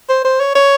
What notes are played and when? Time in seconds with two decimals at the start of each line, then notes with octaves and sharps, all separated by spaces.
0.09 C5
0.25 C5
0.41 C#5
0.55 C#5